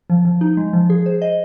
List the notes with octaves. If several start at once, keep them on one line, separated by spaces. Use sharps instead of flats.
F3
F3
D#4
G#3
F3
G#4
C5
D#5